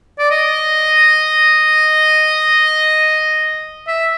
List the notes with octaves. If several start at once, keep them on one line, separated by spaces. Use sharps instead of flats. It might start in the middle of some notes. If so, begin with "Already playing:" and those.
D5
D#5
E5